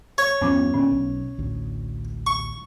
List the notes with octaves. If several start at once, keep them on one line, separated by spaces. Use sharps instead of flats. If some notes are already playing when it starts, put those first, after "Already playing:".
C#5
E2 G2 F3 B3 C#4 D6
A#2 D3 C#4
B1
A1 D2
C#6